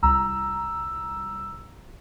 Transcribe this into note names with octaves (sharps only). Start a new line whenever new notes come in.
C2 A#5 E6